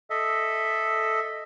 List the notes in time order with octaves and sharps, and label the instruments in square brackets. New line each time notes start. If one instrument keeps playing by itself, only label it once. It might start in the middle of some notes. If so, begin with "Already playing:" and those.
[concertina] A4 D#5 E5